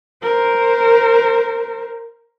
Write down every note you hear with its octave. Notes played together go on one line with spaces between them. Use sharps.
A#4 C5